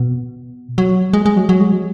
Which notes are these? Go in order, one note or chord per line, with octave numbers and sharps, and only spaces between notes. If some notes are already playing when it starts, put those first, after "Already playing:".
Already playing: B2
F#3
G#3
G#3
F#3
F#3
G#3
F#3